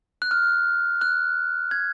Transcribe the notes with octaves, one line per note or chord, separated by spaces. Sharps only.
F#6
F6
F#6
G#6